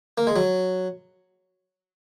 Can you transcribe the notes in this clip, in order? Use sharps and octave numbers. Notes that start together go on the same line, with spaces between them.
A#3
G#3
F#3